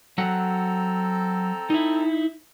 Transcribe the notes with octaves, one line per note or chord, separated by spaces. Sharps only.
F#3 C4 A4 F#5 A#5
D#4 E4